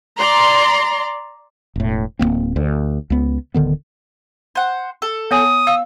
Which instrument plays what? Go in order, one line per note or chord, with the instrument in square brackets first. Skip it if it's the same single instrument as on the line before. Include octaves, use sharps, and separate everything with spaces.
[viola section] D5 A#5 C6
[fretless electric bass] E1 A2
D1 A2 A#3 C4
D2
C#2 B3
D1 D3 D#3 B3
[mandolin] C5 F#5
A4
[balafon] B3 C#5 G#5 [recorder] D#6
[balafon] F5 [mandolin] E6